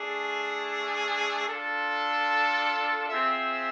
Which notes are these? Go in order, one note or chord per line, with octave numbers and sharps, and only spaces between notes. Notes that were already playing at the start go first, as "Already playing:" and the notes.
Already playing: A3 D4 G#4
D4 F4 A4
C4 F4 G#4 C5 E5